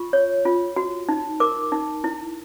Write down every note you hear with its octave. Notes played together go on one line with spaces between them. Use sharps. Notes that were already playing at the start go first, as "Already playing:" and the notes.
Already playing: F4 C#6
C#5
F4
F#4
D#4
A#4 D6
D#4
E4